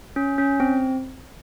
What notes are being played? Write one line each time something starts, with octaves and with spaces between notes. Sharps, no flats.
C#4
C#4
C4